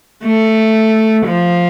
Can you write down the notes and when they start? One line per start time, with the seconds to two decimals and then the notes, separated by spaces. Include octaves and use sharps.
0.24 A3
1.26 F3